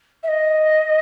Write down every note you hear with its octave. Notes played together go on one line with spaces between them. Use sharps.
E5
D#5